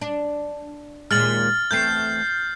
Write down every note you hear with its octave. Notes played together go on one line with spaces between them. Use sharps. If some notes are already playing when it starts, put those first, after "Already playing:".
D4
D#2 A#2 G#3 F6 A6 F#7
E2 A3 C4 G6 C7